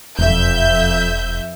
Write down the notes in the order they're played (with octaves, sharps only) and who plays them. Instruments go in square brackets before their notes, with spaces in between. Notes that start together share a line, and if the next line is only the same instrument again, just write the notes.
[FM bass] E1 [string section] F2 E5 G6